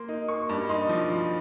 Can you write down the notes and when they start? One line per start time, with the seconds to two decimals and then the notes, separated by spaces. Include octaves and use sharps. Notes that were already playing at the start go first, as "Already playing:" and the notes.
Already playing: A#3 C6
0.08 D#4
0.28 A#3 C#6
0.49 G2
0.69 D#4 C6
0.89 F3
1.10 F3